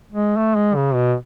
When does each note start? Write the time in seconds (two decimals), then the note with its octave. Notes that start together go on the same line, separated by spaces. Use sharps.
0.12 G#3
0.37 A3
0.56 G#3
0.76 C#3
0.94 B2